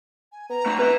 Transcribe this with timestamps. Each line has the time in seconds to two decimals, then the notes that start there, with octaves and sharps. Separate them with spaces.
0.32 G#5
0.49 B3 A#5
0.66 A3 C4
0.79 B3 B4 E5